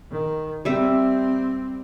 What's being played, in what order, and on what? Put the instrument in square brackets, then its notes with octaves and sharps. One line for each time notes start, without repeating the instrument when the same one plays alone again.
[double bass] D#3
[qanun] G3 E5 [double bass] C4